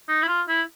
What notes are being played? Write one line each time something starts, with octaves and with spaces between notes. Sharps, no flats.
D#4
E4
F4
E4